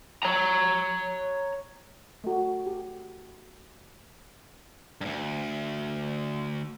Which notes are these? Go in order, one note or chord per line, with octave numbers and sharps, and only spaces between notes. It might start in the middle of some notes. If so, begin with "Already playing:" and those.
C#5 A#5
A3 F#4
G4
D2 G2